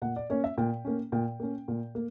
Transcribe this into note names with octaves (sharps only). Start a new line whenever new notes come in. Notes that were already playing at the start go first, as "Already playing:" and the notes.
A#2 F#5
D5
A#3 C#4 C#5
E5
A#2 G5
A#3 C#4
A#2 G5
A#3 C#4
A#2
A#3